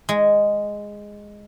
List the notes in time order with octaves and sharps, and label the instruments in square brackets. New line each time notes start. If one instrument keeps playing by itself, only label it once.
[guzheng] G#3